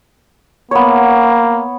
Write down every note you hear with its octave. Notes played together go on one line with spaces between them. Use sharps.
A#3 B3 C#5